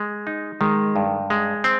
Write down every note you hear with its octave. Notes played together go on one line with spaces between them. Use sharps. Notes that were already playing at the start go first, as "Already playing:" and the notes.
Already playing: G#3
D#4
D#3 G#3
G2
G#3
C4